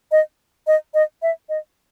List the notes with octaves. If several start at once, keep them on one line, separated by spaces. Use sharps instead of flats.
D#5
D#5
D#5
E5
D#5